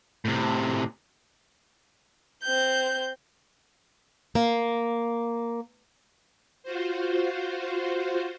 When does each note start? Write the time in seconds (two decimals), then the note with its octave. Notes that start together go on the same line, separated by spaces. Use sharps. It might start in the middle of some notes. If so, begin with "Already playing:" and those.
0.25 A2 C3
2.43 C4 G6
4.35 A#3
6.63 F4 F#4 C5